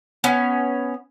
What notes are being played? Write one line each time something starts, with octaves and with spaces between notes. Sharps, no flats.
B3 C#4